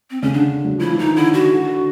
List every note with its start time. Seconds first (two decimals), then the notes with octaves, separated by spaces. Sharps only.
0.10 C4
0.22 C#3 C#4
0.33 D3 D4
0.64 F#3
0.78 F3 E4
0.90 E3
0.99 D#3 D#4
1.15 D3 E4
1.34 F#4
1.51 D3